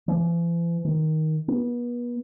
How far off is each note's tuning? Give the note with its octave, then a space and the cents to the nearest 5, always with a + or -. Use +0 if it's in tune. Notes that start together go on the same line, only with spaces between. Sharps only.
E3 +45
D#3 +10
B3 -35